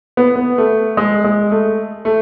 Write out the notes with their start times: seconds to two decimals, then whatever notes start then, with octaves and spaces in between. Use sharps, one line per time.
0.17 B3
0.36 B3
0.58 A3
0.97 G#3
1.24 G#3
1.51 A3
2.05 A3